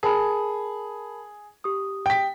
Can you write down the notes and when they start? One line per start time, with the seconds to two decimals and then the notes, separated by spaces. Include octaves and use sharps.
0.03 G#4 A#4 A5 B5
1.64 G4 D#6
2.06 G5 B6